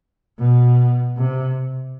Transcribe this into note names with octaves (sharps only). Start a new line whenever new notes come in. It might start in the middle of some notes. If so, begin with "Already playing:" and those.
B2
C3